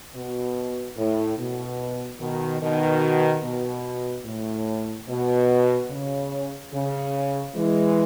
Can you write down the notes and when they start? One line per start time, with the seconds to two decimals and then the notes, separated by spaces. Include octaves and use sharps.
0.14 B2
0.97 A2
1.38 B2
2.20 B2 D#3
2.61 B2 D#3
3.43 B2
4.26 A2
5.08 B2
5.90 C#3
6.73 C#3
7.55 E3 G#3